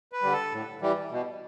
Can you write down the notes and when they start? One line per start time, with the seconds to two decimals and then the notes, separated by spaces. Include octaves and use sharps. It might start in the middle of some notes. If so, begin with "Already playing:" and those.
0.12 B4
0.22 D3 G3
0.32 A4
0.52 A2
0.82 E3 G3
1.11 B2